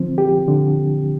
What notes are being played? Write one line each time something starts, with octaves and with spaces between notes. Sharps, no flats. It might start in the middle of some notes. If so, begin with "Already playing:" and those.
Already playing: D3 F3 C4
G4
D3